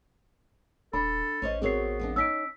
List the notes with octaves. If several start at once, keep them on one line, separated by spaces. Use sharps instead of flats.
D#1 D4 A4 B5
A1 C#4 C5 D#5
B3 C4 F#4 G#4 A#4 C#5 C7
F2 C4 D4
C#4 D#4 E6 B6 D7